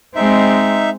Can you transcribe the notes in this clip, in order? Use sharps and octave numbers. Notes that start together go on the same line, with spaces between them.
G#3 C4 D#4 E5